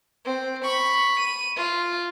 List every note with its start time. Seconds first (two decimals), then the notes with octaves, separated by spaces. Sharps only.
0.25 C4
0.64 B5 C#6
1.20 D#7
1.56 F4